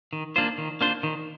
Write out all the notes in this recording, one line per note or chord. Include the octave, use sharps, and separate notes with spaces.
D#3
A#3 D4 F4 C5
D#3
A#3 D4 F4 C5
D#3